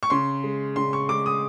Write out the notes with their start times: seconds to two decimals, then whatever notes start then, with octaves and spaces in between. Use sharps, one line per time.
0.03 C#6
0.10 C#3 C6
0.44 G#3
0.76 C#3 C6
0.93 C#6
1.09 G#3 D6
1.26 D#6